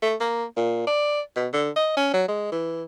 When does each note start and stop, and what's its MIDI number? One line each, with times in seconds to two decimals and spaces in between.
0.02 0.15 57
0.20 0.45 58
0.56 0.85 46
0.87 1.21 74
1.36 1.48 47
1.53 1.70 50
1.76 1.92 75
1.97 2.11 61
2.14 2.26 54
2.28 2.52 56
2.52 2.83 52